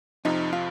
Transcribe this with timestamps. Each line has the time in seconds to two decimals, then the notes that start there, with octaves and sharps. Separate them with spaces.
0.25 F2 C3 F3 D#4
0.53 F4